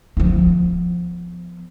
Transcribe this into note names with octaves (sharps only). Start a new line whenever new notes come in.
F3 B3